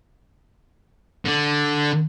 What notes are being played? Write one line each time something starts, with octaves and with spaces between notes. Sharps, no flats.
D3 D4